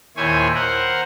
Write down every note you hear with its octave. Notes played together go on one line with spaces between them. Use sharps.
D#2 A#2 E4 C5 C#5 G#5
A#4 C5 F#5